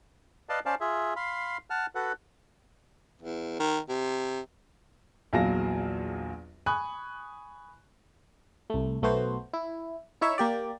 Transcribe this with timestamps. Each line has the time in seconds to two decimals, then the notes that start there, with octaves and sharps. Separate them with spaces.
0.49 B4 D5 D#5 F5 A5
0.66 C#4 C5 D5 F5 A5
0.81 F4 G#4 E5
1.16 F5 B5 C6
1.70 F#5 A5 F6
1.95 F#4 A4 B4 F#5
3.22 E2
3.60 D#3
3.89 C3
5.33 A#1 E2 F#3 F5 A5 A#6
6.66 G#5 B5 C#6 D#6 F#6
8.70 C2 A3
9.02 B1 A3 B3 F#4 C5
9.53 E4
10.21 D#4 E4 C#5 E5
10.38 A#3 G4 D5